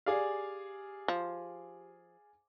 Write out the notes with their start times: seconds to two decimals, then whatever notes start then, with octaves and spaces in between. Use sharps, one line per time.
0.06 G4 G#4 D5 F5
1.08 F3